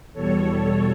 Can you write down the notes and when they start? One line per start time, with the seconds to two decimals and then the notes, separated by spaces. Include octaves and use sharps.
0.13 E2 B2 G3 A4 C#5